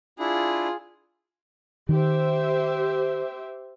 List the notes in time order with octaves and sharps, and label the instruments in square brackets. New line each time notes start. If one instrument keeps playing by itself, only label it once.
[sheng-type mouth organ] D4 E4 [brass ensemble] F4 [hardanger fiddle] G#4
[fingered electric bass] D#3 [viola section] G4 C5 E5